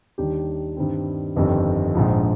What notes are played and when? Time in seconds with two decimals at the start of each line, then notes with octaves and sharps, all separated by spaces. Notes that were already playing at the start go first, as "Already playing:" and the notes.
0.18 D#2 D#3 G3 D4 G4
0.77 G2 D#3 G3 C4
1.36 G1 F2 D#3 G3 C4
1.95 A#1 G#2 F3